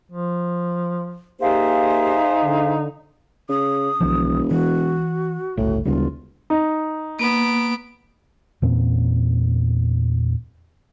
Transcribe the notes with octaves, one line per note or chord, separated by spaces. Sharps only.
F3
A#3 D#4 G4 G#4 C5 E5 F5
D3
C#3 D#6
E1 B1 D#3 F3
E3 F#4
G1 C#2 A2
E1 D2 C#3 G3 F4
D#4
A#3 B3 D7
E2 A#2 C4 C#4